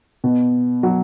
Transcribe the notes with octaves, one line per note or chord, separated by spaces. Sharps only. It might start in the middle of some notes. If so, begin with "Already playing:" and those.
B2
F#3